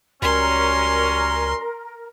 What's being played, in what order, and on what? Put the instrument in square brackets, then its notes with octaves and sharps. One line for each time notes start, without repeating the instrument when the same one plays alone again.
[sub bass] C#2 [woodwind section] F#3 G3 C#4 [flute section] A#4 [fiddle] C6